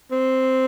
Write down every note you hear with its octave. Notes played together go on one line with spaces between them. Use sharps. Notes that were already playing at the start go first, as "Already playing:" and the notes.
C4